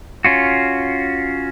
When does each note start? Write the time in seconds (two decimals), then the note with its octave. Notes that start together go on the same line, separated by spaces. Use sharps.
0.25 C#4 F4 F#4